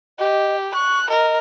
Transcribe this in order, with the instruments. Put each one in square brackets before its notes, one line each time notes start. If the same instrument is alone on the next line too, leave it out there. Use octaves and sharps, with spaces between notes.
[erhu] G4 [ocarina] D#5
[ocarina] C#6 [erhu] F#6
[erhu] A#4 [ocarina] D#5